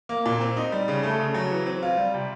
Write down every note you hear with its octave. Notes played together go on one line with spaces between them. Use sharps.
A#3
A#2
C4
D#4
G3
C#3
A3
C#3
F#3
E3
C4
F4
G3
C3